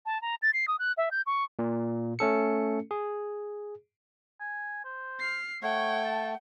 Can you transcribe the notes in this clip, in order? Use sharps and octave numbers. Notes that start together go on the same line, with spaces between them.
A5
A#5
A6
C7
D#6
F#6
E5
G6
C#6
A#2
A3 C#4 A4 C#7
G#4
G#5
C5
F6 C7
A3 C#5 F#5 G5
A5